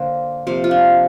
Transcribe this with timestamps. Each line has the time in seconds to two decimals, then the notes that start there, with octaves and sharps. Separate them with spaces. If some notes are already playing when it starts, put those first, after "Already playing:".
Already playing: D3 A#3 C5
0.47 C3 F3 A#3 C5
0.64 F4
0.71 D4